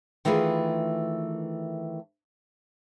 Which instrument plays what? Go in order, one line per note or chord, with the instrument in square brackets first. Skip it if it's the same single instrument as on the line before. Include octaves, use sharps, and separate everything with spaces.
[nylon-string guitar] D#3 E3 A3 F4 G#4 B4